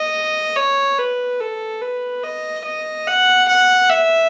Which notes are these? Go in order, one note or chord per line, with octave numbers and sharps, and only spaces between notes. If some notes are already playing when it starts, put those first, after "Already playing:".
Already playing: D#5
C#5
B4
A4
B4
D#5
D#5
F#5
F#5
E5